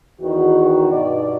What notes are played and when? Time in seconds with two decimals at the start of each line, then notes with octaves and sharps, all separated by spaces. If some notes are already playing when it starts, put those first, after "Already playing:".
0.20 E2 D#3 F#4
0.90 G2 B2 D#4 D5